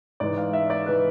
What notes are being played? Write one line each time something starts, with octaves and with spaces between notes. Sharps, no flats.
G#2 E3 D5
F5
E5
D5
E3 B4